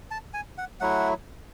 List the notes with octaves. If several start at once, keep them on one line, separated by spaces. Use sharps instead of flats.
A5
G#5
F#5
F#3 A3 E4 F#5